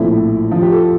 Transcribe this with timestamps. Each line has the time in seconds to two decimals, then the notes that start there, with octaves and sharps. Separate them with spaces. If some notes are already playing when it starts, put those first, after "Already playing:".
Already playing: A#1 A2 F3 A3 C4 E4
0.51 F2 C3 F3 F4
0.62 G4
0.72 A4